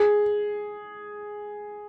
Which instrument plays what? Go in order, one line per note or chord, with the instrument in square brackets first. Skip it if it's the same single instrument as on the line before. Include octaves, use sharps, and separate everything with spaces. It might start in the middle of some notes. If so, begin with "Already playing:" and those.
Already playing: [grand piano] G#4